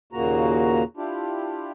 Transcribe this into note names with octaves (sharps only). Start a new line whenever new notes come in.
D#2 A#2 C#3 A#3 F#4 A#5
D4 E4 F4 G4